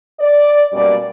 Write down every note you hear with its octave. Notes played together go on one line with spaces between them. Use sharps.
D5
F#2 B2 G3 A#3 D5